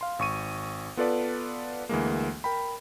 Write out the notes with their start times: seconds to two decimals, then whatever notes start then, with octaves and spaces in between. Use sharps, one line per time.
0.01 F5 C6
0.19 G#1 C#6 D#7
0.97 B3 F4 A4 B4 D5 A5
1.89 D2 E3 G#3 A#3
2.44 A#4 G5 B5